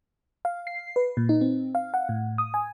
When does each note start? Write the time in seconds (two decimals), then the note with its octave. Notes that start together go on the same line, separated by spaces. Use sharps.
0.45 F5
0.67 C7
0.96 B4
1.17 A#2
1.29 D#4
1.41 C4
1.75 F5
1.94 F#5
2.09 A2
2.38 D#6
2.54 G#5